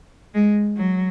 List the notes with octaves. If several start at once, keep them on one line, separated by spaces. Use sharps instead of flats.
G#3
F#3